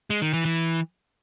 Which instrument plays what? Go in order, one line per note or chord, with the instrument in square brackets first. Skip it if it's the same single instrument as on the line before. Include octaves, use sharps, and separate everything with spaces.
[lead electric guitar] G#3
D#3
E3
E3